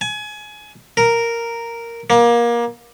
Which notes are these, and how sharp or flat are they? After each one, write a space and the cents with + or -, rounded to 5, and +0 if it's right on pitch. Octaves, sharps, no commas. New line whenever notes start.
G#5 +25
A#4 -5
A#3 +25